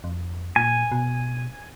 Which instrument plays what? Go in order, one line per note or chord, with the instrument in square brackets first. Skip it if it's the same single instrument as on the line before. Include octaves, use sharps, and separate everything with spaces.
[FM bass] F2
[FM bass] A#2 [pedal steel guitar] G#5
[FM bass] B2